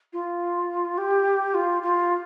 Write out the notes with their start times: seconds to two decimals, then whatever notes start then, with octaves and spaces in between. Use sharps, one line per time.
0.13 F4
0.97 G4
1.54 F4
1.82 F4